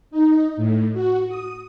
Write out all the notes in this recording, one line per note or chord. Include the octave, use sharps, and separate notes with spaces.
D#4
A2
F#4
D#6